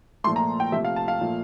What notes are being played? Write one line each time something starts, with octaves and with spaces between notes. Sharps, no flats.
A#2 F3 A3 C6
A#5
G5
C3 F3 A3 E5
F5
A5
F5
A#2 F3 A3